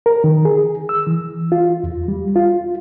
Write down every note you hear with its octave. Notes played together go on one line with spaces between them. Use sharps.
A#4
D#3
G#4
E6
E3
F4
E2
G3
F4